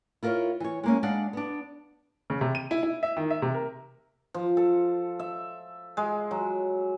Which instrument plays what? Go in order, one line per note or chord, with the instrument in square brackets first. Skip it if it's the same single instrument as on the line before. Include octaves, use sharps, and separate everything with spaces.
[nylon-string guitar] E4 F4 A#4 C5 C#5
E3 C#5
G#3 A#3 C#4
G#3 D4 D5 F5 F#5
B3 D4
[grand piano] C#3
C3
D#7
E4
E4
E5
D#3
E5
C3
A#4
[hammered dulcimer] F3
A4
E5
G#3
F#3